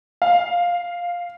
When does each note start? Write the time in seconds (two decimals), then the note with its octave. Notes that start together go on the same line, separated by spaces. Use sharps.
0.22 F5